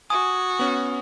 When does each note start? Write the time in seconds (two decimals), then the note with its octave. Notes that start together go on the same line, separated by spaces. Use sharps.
0.10 F#4 G#5 D#6
0.59 B3 C#4